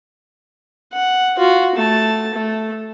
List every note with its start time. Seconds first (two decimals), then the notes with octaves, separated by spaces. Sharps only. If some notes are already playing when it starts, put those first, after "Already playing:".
0.92 F#5
1.37 F4 F#4
1.75 A3 A5
2.34 A3